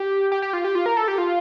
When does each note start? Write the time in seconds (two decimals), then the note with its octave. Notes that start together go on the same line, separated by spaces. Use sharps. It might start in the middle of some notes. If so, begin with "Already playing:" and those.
Already playing: G4
0.32 G4
0.42 G4
0.53 F4
0.64 G4
0.75 F4
0.86 A#4
0.97 A4
1.08 G4
1.18 F4